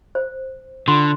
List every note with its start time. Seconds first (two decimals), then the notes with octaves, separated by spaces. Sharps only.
0.15 C5
0.88 D3 F4 C6